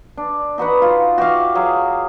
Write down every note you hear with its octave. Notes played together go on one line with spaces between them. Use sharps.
D4
D#4 F#4 B4 F#5
F4
F#4 G4 E5 F5
F#3 G#4 F5